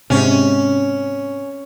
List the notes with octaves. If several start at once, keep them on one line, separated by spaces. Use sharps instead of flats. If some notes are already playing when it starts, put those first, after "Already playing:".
G#2 C3 C#4